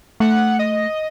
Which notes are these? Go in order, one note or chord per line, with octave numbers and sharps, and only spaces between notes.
A3 F#5
D#5